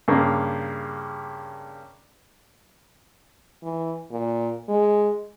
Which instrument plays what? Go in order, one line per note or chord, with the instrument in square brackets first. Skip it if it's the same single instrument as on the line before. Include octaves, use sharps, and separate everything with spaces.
[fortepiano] G2 C#3 A#3
[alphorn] E3
A#2
G#3